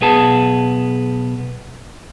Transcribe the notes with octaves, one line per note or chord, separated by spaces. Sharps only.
B1 B3 G#4 A5